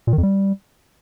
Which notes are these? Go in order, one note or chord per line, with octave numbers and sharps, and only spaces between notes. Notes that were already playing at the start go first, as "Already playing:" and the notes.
A#2
D#3
F2
G3